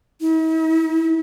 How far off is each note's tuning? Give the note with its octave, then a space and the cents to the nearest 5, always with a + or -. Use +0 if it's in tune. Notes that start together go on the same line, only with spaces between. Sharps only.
E4 -45